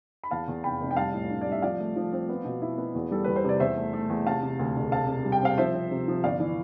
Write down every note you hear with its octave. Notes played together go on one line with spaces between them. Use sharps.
B5
E2 F5 A5
E2
F1 G5 B5
F1
G5
G3 F5 A5
A2
D4
D5
G3
E5
F3 D5 F5
A3
F3
C4
B3
B2
E4
B3
E2
G3 A4
E2 B4
C5
C3 D5
E2 C5 E5
A3
A3
E2
C3 F5 A5
C3
D2
E1
C3 F5 A5
C3
G3
G5
C4 F5
F3 C5 E5
C4
C3
F3
G1 D5 F5
E3